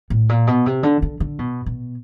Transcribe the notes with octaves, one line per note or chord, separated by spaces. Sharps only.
A2
A#2
B2
C3
D3
D3
D3
B2
B2